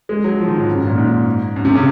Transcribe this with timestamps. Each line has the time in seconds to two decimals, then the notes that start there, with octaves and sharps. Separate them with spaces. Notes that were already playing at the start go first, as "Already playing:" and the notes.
0.09 G#3
0.24 F#3
0.38 F3
0.48 D#3
0.58 G#2
0.67 F#2
0.78 G#2
0.87 A#2
0.98 G#2
1.56 F#2
1.65 C3
1.75 C#3